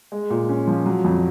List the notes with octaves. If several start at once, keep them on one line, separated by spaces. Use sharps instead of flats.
G#3
A#2
C#4
F3
F#3
F2